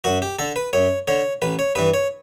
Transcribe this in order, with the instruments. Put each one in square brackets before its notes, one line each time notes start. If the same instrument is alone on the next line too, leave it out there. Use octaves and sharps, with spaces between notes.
[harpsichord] F#2 F#4
G4
D3 A4
B4
F#2 C#5
D3 C#5
A1 B4
C#5
G2 E3 B4
C#5